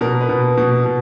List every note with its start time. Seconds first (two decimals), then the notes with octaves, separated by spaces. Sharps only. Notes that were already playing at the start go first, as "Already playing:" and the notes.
0.01 B2 A#4
0.21 B4
0.29 B2
0.57 B2
0.85 B2